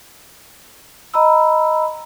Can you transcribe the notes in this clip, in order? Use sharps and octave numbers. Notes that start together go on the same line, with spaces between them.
D#5 A#5 B5 E6